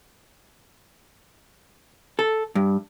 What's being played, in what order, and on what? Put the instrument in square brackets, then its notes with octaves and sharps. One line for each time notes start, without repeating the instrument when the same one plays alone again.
[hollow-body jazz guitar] A4
G2